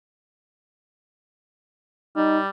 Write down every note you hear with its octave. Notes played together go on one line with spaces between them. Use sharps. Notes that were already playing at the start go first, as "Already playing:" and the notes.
G3 D#4